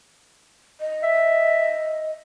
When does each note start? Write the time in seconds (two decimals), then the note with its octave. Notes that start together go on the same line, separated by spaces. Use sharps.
0.80 D#5
1.03 E5